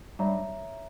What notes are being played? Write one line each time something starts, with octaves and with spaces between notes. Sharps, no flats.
G2 C#5 E5 A#5